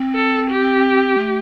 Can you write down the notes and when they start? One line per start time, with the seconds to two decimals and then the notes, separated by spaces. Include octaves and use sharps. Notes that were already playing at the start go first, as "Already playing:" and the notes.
Already playing: C4
0.15 A4
0.50 G4
1.18 A3